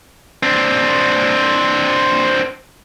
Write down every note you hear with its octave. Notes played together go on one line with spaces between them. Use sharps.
C4 D4